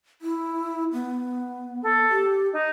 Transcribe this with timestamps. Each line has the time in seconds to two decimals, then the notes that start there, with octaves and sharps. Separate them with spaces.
0.22 E4
0.93 B3
1.82 A4
2.10 G4
2.52 D#4